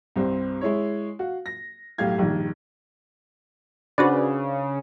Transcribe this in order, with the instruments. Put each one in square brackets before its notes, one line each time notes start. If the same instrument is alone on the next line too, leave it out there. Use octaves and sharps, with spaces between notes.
[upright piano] C2 G2 C4
G#3 E4 C#5
F#4 F5
A#6
B1 A2 G4 F5 G#6
A#1 G2 D#3
[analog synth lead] C#3 [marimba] D4 C5 [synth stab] F#4 B4 D5